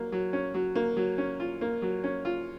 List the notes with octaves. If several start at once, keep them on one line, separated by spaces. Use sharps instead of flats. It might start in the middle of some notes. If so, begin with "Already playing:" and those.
Already playing: F#3 A#3
F#3
C#4
F#3
A#3
F#3
C#4
F4
A#3
F#3
C#4
F4